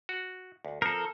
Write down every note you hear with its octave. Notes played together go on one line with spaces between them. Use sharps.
F#4
D2
F3 C4 A4 A#4